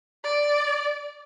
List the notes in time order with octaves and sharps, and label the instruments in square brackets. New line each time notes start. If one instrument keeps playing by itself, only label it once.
[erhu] D5